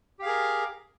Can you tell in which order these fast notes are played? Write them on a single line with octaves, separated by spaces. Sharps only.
G4 F5 G#4 A#4